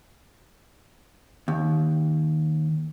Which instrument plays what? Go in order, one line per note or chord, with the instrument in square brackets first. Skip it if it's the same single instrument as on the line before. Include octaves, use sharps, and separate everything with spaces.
[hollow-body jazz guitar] D#2